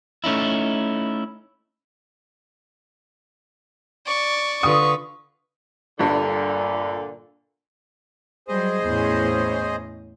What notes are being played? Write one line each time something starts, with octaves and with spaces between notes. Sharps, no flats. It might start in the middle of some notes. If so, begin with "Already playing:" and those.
A3 C#4 D#4 E4
D5 C#6
D3 F4 B4 C#6 D#6
G1 G2 A#2 D3
F#3 G3 G#4 C5 D#5
E2 A2 C#4